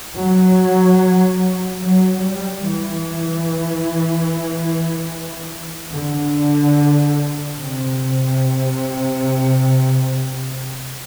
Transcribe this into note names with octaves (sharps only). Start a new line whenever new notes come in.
F#3
F#3
G3
E3
D3
C3